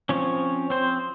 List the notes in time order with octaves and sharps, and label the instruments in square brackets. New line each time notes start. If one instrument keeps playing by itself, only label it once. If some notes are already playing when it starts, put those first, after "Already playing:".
[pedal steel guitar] F3 C4 C#4 C#5
C4 C5